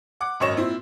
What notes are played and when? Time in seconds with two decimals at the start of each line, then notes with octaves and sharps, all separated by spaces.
0.21 F#5 D6
0.40 G#1 F#2 C#5 D#5 E7
0.56 A#2 C4 E4 C5